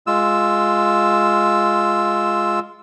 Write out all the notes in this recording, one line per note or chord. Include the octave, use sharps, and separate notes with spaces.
G#3 F4 E6